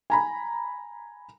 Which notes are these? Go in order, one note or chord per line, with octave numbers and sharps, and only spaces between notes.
G#5 A#5 B5